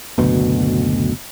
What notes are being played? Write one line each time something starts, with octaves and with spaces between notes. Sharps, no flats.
F#1 D2 B2